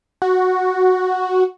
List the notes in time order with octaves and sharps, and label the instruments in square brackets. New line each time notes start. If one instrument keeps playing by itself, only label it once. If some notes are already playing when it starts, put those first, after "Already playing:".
[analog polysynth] F#4